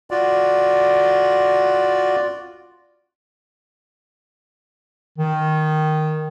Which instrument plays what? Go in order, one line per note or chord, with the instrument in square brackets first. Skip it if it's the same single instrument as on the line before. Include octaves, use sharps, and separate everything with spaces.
[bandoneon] F4 F#4 D5
[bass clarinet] D#3